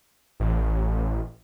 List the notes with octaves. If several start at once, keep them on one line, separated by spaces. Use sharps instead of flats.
A1